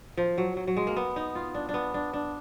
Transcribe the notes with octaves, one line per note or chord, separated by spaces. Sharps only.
F3
F#3
F#3
F#3
G#3
A#3
B3
D#4
F4
D4
D4
B3
D4
D4